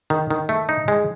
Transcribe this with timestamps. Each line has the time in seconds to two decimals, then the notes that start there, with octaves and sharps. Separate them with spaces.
0.10 D#3
0.30 D#3
0.49 A3
0.69 D#4
0.88 G#3